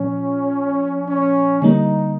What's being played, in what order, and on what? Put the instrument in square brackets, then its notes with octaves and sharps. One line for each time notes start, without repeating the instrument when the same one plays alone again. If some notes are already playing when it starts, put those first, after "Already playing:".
Already playing: [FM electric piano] A#2 F3 [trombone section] C#4
[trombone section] C#4
[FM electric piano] D3 G3 A#3 [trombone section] D#4